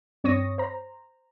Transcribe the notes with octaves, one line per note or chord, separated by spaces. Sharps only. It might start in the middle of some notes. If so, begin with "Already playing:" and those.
G2 C4 C#5 C#6 D#6 A#6
C5 A#5